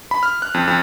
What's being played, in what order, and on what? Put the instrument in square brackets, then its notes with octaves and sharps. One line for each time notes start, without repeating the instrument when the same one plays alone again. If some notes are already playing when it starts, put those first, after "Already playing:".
[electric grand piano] B5
F6
F#6
F2
F2